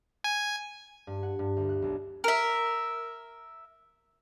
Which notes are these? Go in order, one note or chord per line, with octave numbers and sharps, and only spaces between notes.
G#5
G2
F#5
G2
D2
F#6
B1
A#4 E5